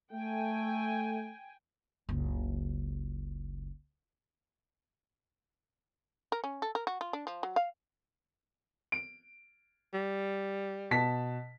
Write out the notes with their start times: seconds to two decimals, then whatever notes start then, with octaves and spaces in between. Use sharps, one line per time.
0.13 A3 G5 G#5
2.09 F#1 C#2
6.32 A#4
6.44 C#4
6.62 A4
6.75 A#4
6.87 F#4
7.01 F4
7.13 D4
7.27 F3
7.43 F#3
7.56 F5
8.92 D7
9.94 G3
10.91 B2 A5 B6